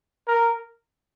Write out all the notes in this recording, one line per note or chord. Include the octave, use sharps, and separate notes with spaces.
A#4